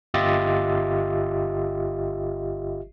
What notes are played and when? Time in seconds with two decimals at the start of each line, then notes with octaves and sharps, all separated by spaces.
0.14 G1 F4 G4 D#5 E5 A6